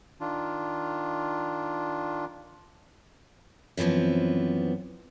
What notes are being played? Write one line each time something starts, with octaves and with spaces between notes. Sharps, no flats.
D#3 D4 F4
F#2 E3 F3 B3 C4